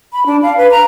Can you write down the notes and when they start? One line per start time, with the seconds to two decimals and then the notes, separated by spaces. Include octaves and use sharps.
0.13 B5
0.26 D4
0.43 F5
0.57 B4
0.71 A#5